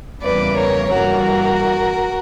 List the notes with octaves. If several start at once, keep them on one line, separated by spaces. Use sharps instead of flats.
E2 C#3 E3 G3 A#3 B4 D5
A#4 C#5
G2 E3 G3 A#3 F#4 A#4